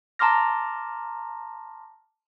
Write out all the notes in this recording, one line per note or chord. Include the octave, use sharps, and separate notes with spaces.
A5 A#5 C6 D6 F6 A#6